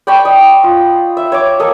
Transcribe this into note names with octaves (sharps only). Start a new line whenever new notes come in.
D5 G5 B5 C#6
D#5
F4
E5
C#5 D6
A#3 A4 D#5